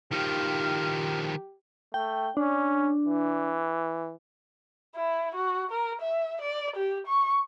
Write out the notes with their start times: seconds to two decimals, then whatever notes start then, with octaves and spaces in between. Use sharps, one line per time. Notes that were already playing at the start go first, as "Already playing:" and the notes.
0.12 D#3 F3 G4 F5
1.94 A3 G5
2.37 C#4 D4
3.05 E3
4.96 E4
5.35 F#4
5.71 A#4
6.01 E5
6.42 D5
6.76 G4
7.07 C#6